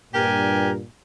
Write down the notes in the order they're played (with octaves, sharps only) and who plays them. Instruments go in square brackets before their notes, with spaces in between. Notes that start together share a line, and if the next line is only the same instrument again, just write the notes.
[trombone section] G2 A#2 [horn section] G4 A#4 G#5